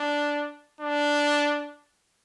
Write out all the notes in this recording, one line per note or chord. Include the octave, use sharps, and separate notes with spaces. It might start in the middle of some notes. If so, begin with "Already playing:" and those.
Already playing: D4
D4